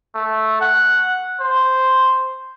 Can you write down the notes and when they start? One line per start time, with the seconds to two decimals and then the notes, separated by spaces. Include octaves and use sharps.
0.15 A3
0.61 F#5
1.40 C5